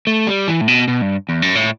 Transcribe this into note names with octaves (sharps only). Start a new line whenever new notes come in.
A3
G3
E3
A2
B2
B2
G2
E2
F#2
A2